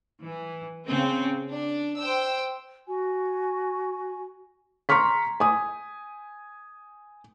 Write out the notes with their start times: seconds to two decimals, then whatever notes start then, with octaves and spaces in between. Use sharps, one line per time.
0.23 E3
0.86 C#3 C4
1.53 D4
1.98 C5 G5 E6
2.86 F#4 G#5
4.89 A#5 C6 C#6 F6 B6
5.40 G#5 D#6